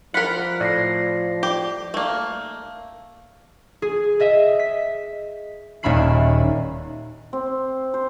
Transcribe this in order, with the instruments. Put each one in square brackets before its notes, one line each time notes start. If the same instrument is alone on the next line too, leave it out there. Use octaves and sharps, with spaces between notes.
[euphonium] F3 [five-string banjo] F4 A#4 [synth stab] F#5 B5
[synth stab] A2 [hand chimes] D5 A#6 C7
[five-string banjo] G4
A3 A#3
[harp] G#4
G#4 D#5 E5
B6
D#1 D#2 C#4 E5 B5 C7
[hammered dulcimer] C4
C5